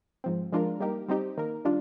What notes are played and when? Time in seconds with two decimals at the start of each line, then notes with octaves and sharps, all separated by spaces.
0.24 G#2 F3 C4
0.52 F3 G#3 D4 F4 A#4
0.80 G3 A#3 D#4 G4 A#4
1.08 G3 C4 D#4 G4
1.37 D#3 A#3 D#4 A#4
1.65 D#3 G3 D4 F4